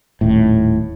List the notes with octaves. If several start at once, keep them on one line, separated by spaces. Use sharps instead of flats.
D#1 A2